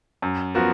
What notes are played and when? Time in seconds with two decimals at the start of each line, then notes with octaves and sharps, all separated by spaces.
0.22 F#2
0.55 F3 B3 F#4 A#4